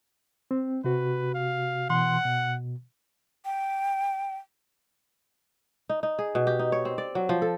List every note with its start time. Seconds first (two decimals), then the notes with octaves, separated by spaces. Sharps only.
0.51 C4
0.84 C3 F#4 B4
1.35 F5
1.90 B2 E3 F#5 C6
2.25 B2
3.45 G5
5.89 D#4
6.03 D#4
6.19 G#4
6.35 B2
6.47 G4
6.59 D#4
6.72 C#5
6.85 C4
6.98 D5
7.15 F#3
7.29 F3
7.42 A4